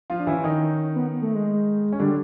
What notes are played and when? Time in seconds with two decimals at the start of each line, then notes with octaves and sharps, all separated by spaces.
0.10 F3 F4
0.19 D4
0.27 E3 C#4 E4
0.44 D#3 D#4
0.95 B3
1.22 A3
1.35 G#3
1.93 C#4
1.99 D3 G3 D4